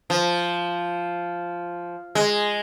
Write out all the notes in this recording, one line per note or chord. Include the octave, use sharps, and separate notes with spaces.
F3
G#3